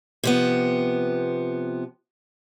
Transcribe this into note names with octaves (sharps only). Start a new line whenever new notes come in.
C3 F3 B3